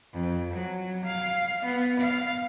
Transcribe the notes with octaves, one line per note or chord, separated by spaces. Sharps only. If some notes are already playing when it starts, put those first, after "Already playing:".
F2
F#3
F5
B3
F5